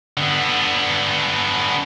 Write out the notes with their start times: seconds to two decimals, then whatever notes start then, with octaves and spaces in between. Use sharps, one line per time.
0.17 D3 B3